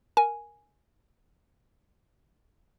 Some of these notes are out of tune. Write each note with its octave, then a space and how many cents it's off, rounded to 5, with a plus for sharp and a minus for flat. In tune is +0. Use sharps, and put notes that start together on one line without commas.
A#4 +0 G#5 +0